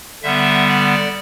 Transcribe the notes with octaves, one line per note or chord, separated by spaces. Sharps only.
D3 G3 B3 E5
D5